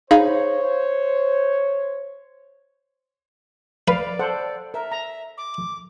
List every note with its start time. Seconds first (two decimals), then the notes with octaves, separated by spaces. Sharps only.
0.11 D#4 G#4 C5 C#5 F5 B5
3.88 B4 D5 F5
4.19 A4 C5 F#5
4.74 A#4 E5
4.92 A#5
5.38 D6